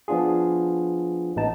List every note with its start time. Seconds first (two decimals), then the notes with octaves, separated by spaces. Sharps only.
0.08 F3 B3 D4 F4 G#4
1.36 A1 B3 D#4 A5